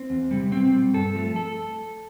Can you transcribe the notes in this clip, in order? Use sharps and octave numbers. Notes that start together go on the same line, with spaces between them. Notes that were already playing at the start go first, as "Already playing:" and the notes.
Already playing: C4
E2
C3 G3
B2 C4
G3
G2 A4
F3 A3
A4